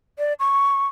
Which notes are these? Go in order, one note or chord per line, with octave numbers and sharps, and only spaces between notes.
D5
C#6